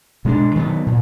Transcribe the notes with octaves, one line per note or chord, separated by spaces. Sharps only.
B2 G#3 B3 D4
D#3 F#3 B3
A#2